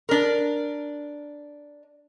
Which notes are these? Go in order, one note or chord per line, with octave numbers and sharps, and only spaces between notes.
D4 A#4